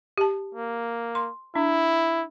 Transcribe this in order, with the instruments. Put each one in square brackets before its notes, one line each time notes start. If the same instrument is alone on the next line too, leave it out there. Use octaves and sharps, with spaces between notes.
[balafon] G4 A5
[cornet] A#3
[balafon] C6
[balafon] D4 [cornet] E4